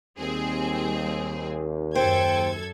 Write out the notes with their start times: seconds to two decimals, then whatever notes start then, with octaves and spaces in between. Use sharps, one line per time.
0.18 D#2 G3 C4 G#4
1.95 F#2 A4 C5 G5 G#6